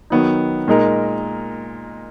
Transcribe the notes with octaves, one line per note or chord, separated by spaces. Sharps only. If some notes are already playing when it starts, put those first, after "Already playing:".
D#3 F#3 B3 D#4
A#2 G#3 D#4 A#4